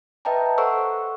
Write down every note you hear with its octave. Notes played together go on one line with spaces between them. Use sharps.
B4 D#5 E5 G5 A5 A#5
A4 C5 F#5 C#6 E6